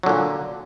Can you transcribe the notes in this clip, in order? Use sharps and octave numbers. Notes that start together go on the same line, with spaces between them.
A#2 D3 F#3